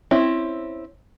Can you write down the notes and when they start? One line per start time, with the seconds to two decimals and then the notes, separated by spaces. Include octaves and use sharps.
0.11 C4 C#4 E4